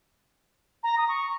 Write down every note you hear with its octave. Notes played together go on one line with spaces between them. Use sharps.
A#5
D#6
C#6